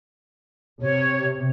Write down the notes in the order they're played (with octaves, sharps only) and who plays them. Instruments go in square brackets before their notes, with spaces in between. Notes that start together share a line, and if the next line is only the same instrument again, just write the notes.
[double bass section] C3 [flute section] C#5